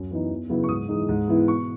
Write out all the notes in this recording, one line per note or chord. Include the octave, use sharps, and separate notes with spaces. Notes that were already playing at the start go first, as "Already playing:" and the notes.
Already playing: F#2
E3 B3 D#4
E2
C#3 F#3 B3 E4
C#6
G#2 D#6
E3 G#3 D#4
G#2
E3 B3 E4
B2 C#6